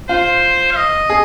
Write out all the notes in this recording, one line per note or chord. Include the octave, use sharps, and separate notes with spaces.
F4 C5
F5
D#5
G#4